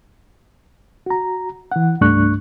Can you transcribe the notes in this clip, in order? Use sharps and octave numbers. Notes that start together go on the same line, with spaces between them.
F#4 A#5
E3 F#5
C2 G2 A3 D4 C#6 F#6